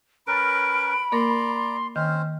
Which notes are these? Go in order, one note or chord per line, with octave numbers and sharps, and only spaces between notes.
C#4 A#4 B4 A#5 B5 A6 D7
A#3 A#4 D5 A#5 C6
D#3 C4 C#4 C5 F6